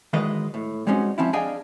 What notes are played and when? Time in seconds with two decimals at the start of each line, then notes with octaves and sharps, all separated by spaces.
0.13 D#3 E3 F#3 G#3 B4 D#5
0.54 A2
0.87 G3 G#3 C4 C#4 D#4 F#4
1.18 F3 C4 C#4 E4
1.33 D4 G#4 D#5 F5 G5 G#5